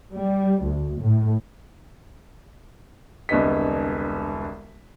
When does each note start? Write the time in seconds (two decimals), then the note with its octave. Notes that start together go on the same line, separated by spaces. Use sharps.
0.13 G3
0.62 D2
1.00 A2
3.29 E1 C2 D3 B3 D#5 B6